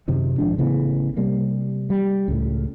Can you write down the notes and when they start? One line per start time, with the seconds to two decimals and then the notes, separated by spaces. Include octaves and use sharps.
0.08 F#2 C3 D#3
0.38 A#1 G#2 F3 D4
0.58 A1 C#3 E3 B3
1.17 C3 G3 A#3
1.90 G3
2.28 C#2 A2